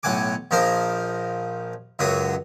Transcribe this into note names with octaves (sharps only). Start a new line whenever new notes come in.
B1 A2 F#5 G#5 D6
A#1 F3 D#4 A#4 C5
C#2 F#2 F#3 F#4 D#6